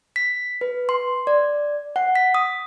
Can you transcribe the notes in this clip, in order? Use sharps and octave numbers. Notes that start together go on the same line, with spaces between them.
B6
B4
C6
D5
F#5
B6
D#6